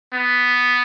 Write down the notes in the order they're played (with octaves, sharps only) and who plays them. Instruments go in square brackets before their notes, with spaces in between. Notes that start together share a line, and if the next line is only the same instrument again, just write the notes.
[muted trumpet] B3